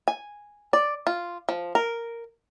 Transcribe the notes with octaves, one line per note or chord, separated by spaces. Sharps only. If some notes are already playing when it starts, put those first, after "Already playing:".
G#5
D5
F4
F3
A#4